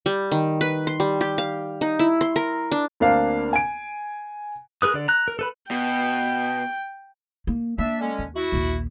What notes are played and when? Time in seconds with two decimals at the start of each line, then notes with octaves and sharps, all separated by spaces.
0.06 G3
0.32 D#3
0.61 B4
0.87 C6
1.00 G3
1.21 G4
1.38 F5
1.81 D#4
1.99 E4
2.21 C6
2.36 A#4
2.71 D4
3.00 D2 A#3 C4 D4 F5
3.53 G#5 D7
4.82 G#4 A#4 B4 D#6
4.94 D3 D5
5.08 A#5 F#6
5.28 A#4
5.39 A4 B4 B5
5.71 B2 G5
7.47 A#3
7.78 A#3 D4 E5
8.01 D3 G#3 C#4
8.19 D#2
8.36 E4 F#4
8.52 A#1 D#2